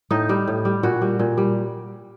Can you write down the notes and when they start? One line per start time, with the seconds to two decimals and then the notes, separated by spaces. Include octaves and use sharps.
0.11 A2 D#4
0.29 G3
0.48 A2
0.65 G3
0.83 A#2 F#4
1.01 G3
1.19 A#2
1.37 G3